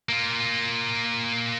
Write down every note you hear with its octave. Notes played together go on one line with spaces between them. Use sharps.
A#3 F4